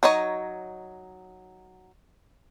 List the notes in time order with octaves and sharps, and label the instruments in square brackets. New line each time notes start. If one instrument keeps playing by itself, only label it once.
[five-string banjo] F#3 D#4 C#5 D#5